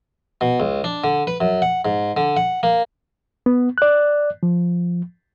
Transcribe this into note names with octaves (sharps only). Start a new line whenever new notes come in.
B2
C#2
D4
D3
B4
F#2
F#5
G#2
D3
F#5
A#3
B3
D5 F#6
F3